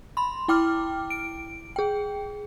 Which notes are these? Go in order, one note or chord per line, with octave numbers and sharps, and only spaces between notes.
B5 C6
E4 G5 D6 F6
D7
G#4 G5